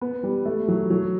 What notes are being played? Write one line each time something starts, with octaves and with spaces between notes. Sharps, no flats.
B3
G3
A3
F#3
F#3